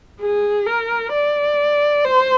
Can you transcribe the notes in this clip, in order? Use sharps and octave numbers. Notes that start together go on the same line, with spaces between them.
G#4
A#4
D5
C5